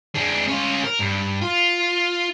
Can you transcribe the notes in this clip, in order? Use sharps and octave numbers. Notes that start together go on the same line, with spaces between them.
G#3 D4
C#4 F4
A#4
G2
F4